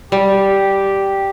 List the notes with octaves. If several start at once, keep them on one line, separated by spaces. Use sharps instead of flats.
G3 G4